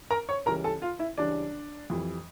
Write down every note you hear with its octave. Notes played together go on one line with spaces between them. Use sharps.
A#4 A#5
C#5 C#6
C#2 C#3 E3 G3 C#4 A#4 A#5
A4 A5
F4 F5
E4 E5
C#2 C#3 E3 G3 C#4 D4 D5
F2 E3 G3